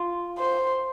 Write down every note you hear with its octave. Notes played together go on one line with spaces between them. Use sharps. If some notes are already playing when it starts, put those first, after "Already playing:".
Already playing: F4
C5